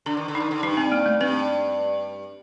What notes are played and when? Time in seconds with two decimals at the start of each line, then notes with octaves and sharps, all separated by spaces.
0.06 D3 D4
0.17 D#3
0.28 D3
0.35 D#4
0.40 D#3
0.51 D3
0.63 G2 D#4
0.77 C4
0.92 A#3
1.06 A3
1.20 G2 C4